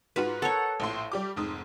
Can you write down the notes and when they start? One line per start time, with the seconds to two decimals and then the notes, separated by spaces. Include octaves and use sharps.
0.16 G#2 F4 F#4 B4
0.42 A4 A#4 C#5 F#5
0.80 A#1 A2 C6
1.12 G3 G4 D6
1.36 F1 G#2 D#6